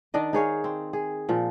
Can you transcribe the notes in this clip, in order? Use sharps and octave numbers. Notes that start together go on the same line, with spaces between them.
D#3 D4 D5 D#5
D#4 G#4 C#5 F5
C4
G#4
A#2 F3